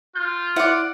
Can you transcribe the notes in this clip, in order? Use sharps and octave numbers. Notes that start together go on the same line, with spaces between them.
F4 G6
E4 D5 F#5